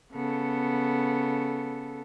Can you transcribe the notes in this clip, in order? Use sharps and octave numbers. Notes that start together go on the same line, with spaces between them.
C#3 B3 A4